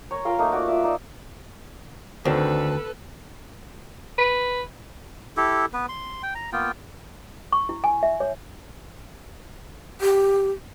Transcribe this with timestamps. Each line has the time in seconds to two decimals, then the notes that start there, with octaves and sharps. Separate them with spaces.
0.11 A#4 C#5
0.25 F4 A#4 F5 G5
0.39 A3 A#3 D#4
0.52 F#4 D5
0.68 F4 D5 E5
0.84 D#4 D5
2.25 D2 D#3 C4 D4 A4 B4
4.18 B4
5.37 E4 G4 A4
5.73 B3 B4
5.89 C6
6.23 G5
6.35 A#5
6.52 A#3 B3 F4 G5
7.52 C#6
7.69 E4
7.84 G#5
8.03 E5
8.20 C#5
10.01 G4